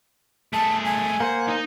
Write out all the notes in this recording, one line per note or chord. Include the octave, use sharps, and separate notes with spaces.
A3 G#4 A5
G#5
A#3 C5 F#5
D#4 D#5